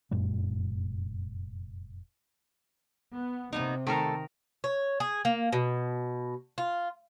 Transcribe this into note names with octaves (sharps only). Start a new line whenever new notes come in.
F1 F#2 A#2 G#3
B3
C3 A#3 B3 D#4
D#3 A3 A4 A#4
C#5
G#4
A#3
B2
F4